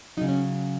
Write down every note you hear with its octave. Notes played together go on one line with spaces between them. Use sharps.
C#3 F#3 D#4
C#4